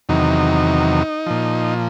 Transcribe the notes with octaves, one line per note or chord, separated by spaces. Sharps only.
E2 C3 D#3 F#3 D#4
A#2 F3